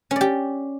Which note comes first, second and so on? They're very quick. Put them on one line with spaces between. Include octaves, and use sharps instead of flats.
C#4 D5 G4